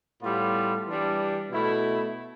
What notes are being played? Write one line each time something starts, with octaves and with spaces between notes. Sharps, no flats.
A2 G3 B3 F4
E3 G3 D4
B2 A3 E4